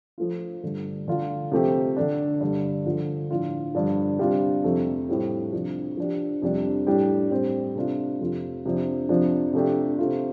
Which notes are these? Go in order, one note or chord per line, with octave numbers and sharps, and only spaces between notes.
F3 A3 F4
G2 D3 A3
D3 A3 F4
C3 F3 A3 C4 G4
D3 A3 D4
G2 D3 A3
D3 F3 A3 F4
A2 F3 D4 F4
G2 D3 F3 D4
C3 G3 D4 F4
F2 C3 A3
A2 G3 C4 F4
C3 F3 D4
F3 D4 G4
F2 C3 G3 D4
A2 G3 D4 G4
A2 G3 C4
C3 A3 D4 F4
F2 C3 A3 F4
F2 C3 F3 D4
F2 C3 F3 D4
C3 F3 A3 D4 G4
C3 A3 F4